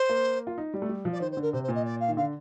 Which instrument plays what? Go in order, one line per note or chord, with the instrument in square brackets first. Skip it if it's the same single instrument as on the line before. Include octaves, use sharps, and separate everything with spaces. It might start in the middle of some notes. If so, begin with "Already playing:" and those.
Already playing: [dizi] C5
[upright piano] A#3
F4
D#4
G3
A3
G3
F3
[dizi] D5
[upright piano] D#3 [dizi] C5
[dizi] C5
[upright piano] D3
[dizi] A#4
[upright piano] C3 [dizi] C5
[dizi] C5
[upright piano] A#2
[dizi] D#5
D5
F5
[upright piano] D#3
[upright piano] D3 [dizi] F5